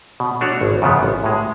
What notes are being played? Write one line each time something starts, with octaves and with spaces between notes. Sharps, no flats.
B2
A3 D4 F#4 C#5
G#1
F#2 C#3 F3 B3
A1
A2 G#3